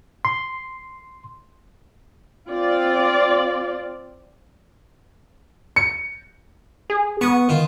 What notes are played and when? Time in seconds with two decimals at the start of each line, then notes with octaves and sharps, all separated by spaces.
0.25 C6
2.49 C4 F4 D5
5.76 C#7
6.90 G#4
7.21 B3 C#6 D#6
7.49 D#3 F4